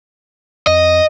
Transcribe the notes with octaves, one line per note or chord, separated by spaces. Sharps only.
F2 D#5